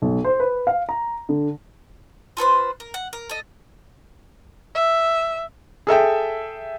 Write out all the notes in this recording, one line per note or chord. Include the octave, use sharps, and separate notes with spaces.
B1
C5
B4
F5
A#5
D3
F4 A4 B4 C5
A#4
F#5
A#4
A4 D#5
E5
G#4 A4 E5 G5